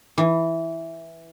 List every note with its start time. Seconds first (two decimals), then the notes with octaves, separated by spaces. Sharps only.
0.18 E3